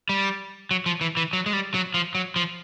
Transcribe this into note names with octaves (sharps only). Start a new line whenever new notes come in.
G3
F#3
F3
E3
E3
F#3
G#3
G3
F#3
F3
F#3
F3